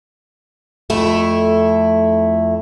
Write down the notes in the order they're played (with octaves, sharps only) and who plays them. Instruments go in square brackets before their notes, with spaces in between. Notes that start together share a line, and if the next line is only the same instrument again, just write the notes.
[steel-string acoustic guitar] F2 A3 E4